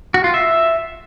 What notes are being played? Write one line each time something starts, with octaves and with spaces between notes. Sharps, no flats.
F#4
F4
E5